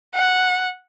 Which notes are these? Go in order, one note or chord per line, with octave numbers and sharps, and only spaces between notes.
F#5